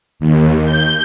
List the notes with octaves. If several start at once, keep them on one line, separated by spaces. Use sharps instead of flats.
D#2
G6